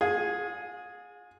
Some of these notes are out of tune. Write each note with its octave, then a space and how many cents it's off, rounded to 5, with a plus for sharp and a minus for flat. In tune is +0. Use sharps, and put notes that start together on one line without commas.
F4 +45 G#4 +0